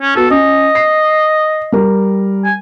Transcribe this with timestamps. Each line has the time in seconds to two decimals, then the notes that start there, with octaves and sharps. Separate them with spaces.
0.01 C#4
0.16 B3 F#4 A4
0.30 C#4 D#5
0.75 C7
1.72 G3 A#4
2.45 G#5